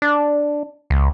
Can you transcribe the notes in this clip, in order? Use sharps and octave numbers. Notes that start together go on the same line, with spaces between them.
D4
C#2